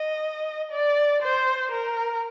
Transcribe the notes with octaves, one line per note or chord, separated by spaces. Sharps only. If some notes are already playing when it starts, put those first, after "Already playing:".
Already playing: D#5
D5
C5
A#4